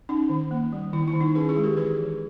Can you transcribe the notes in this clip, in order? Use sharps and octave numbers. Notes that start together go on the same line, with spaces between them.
C#4 D#4
D#3
A#3
G3
D#3 E4
E4
D#3
D#4
C#4 G#4 B4
E4 G#4
G#3
G4 A#4
E3 G#4 B4
E3